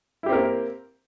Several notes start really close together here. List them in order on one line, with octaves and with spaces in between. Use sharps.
E4 G4 C4 A#4 A#3